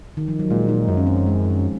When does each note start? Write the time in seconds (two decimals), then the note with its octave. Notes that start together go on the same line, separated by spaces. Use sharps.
0.17 D#3
0.28 F3
0.39 F#3
0.50 A#2 G#3
0.69 D#4
0.88 F#2 F4
0.97 C#4
1.07 C4
1.17 F3
1.26 G#3